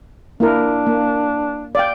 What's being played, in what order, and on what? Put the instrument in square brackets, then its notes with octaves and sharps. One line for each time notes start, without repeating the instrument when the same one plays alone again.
[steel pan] A#3 E4 A#4 [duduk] D4
[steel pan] A#3
D5 F5 G5